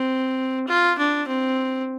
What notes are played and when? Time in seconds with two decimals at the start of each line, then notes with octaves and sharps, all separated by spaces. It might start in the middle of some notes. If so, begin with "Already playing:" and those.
Already playing: C4
0.68 F4
0.98 D4
1.28 C4